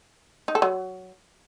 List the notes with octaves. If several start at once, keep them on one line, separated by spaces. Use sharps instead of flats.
D#4
A4
F#3